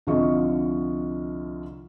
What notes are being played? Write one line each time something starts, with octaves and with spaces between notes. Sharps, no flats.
C2 D3 F3 F4 D#5 C#6